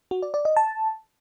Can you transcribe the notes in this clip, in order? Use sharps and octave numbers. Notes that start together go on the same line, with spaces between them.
F#4
D5
D5
D#5
A5